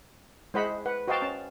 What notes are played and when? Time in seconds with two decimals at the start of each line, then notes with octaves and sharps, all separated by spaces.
0.54 G#3 E4 C5 D#5 F#5 B5
0.86 B4 F#5
1.08 F#4 C5 D#5 F5 G5 A5
1.22 C#4 A5